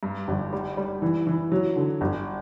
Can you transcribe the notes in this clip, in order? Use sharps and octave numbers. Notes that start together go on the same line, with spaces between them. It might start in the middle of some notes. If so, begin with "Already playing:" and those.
G2
G1
G3
G3
E3
E3
F#3
D3
G1